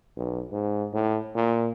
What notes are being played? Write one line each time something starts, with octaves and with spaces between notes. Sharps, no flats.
B1
G#2
A2
A#2